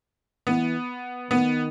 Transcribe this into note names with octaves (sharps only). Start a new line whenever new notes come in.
E3 B3
D#3 B3